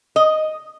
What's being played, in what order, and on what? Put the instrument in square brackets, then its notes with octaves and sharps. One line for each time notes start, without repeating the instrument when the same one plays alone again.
[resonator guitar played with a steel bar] D#5